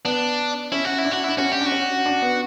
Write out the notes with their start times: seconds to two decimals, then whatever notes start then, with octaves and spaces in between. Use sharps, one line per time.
0.05 B3 D4
0.72 C#4 E4
0.85 F#4
0.98 E4
1.05 D4
1.11 F#4
1.24 D4 E4
1.38 C#4 F#4
1.52 G4
1.61 D4 F#4
1.72 C#4
2.06 D4
2.22 B3